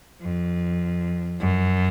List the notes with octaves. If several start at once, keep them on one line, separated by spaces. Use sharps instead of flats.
F2
F#2